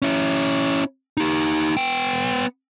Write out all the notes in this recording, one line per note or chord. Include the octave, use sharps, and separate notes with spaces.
C#4 E4
D#4 G4
B3 G5